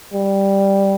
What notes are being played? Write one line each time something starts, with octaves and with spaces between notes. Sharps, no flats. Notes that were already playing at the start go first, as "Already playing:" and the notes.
G3